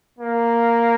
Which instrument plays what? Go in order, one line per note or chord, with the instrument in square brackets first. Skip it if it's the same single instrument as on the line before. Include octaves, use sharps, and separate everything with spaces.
[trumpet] A#3